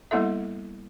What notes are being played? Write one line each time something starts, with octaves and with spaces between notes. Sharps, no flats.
G3 A#3 B3 E4 A4 E5